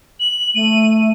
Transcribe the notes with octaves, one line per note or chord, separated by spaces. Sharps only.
F#7
A3 D#7